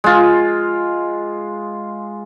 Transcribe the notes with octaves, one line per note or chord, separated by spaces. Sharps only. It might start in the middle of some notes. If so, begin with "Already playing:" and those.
G#3 F4